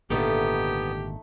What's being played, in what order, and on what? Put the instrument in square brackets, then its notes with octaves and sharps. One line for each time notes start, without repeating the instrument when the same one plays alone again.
[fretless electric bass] G#1 A#2 D3 [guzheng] A3 D#4 A4 [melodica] B3 [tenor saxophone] G4